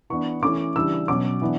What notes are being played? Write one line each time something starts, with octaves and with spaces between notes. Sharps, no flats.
E3 B3 D4 C#6
E3 A3 C#4 D6
C#3 E3 G3 D4 E6
B2 F#3 C#4 D6
E3 B3 D4